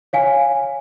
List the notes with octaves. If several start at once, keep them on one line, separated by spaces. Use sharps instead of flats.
C#5 F5 G#5